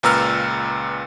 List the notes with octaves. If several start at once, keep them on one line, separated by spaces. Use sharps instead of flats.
C#2 A#2 B4 A#5 E6 F6